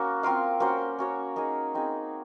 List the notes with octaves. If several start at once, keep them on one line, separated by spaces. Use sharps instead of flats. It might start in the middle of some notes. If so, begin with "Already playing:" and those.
Already playing: A#3 C#4 F#4
C4 F4 A#4 F5
A#3 C#4 F#4 C5
C#4 F#4 C#5
A#3 D#4 G#4
C4 D#4 G#4